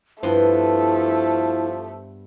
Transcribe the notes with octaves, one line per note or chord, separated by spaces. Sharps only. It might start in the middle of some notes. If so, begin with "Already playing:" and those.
G2 F3 A3 B3 E4 A4 C6